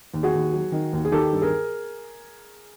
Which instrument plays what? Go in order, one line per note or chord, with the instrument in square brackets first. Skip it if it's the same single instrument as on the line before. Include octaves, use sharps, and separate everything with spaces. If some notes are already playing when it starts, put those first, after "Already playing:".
[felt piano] D#2
F#4 G#4
D#2
F#3
D#3
D#2
G#4
D#3 G4 A4
G2
G#4 A#4